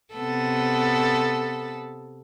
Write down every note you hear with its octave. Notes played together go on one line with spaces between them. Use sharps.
C3 B3 A4